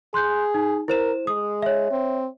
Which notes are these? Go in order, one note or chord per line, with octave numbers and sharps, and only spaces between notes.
G#4 C6 F#6 G6
D#4
E4 A#4 C5 E7
G#3 D#6
C#5 E5
C4